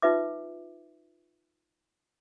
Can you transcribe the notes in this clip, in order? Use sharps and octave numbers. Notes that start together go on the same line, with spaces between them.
D#4 F4 B4 E5 D6